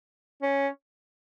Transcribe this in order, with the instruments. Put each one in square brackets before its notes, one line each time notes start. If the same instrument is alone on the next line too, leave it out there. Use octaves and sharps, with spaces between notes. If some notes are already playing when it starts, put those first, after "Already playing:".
[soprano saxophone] C#4